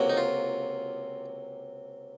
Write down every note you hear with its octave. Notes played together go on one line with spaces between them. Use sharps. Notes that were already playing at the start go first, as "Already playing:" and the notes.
Already playing: C#2 C3 F#3 A#3
D#4
F4